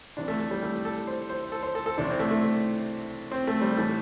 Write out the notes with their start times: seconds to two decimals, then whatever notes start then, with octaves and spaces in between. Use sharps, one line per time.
0.17 C2 C3 E3 D4
0.28 A3
0.40 A3
0.51 G3
0.62 A3
0.85 A4
1.07 C5
1.29 C5
1.52 A4
1.63 C5
1.75 A4
1.86 A4
1.97 C2 C3 E3 D4
2.08 C4
2.19 A3
2.31 A3
3.31 C4
3.47 A3
3.62 G3
3.77 A2 E3 A3